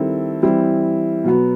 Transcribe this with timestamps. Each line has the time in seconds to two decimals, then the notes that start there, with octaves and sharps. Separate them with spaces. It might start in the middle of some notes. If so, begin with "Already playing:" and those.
Already playing: D#3 G3 C4 E4 A4
0.42 E3 G3 C4 E4
1.24 B2 F#3 B3